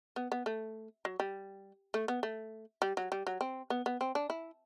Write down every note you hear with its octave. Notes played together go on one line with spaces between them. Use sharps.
B3
B3
A3
F#3
G3
A3
B3
A3
G3
F#3
G3
F#3
C4
B3
B3
C4
D4
E4